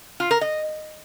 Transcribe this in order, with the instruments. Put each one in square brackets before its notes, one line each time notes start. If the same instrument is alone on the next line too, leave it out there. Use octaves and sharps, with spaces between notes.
[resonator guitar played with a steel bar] F4
A#4
D#5